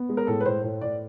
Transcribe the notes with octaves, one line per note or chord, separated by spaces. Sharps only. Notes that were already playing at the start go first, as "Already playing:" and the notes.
Already playing: B3
G#3
A#4
A2 A4
B4
A2 C5
A2
A2 D5